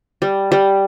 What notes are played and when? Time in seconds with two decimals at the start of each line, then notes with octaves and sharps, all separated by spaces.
0.22 G3
0.52 G3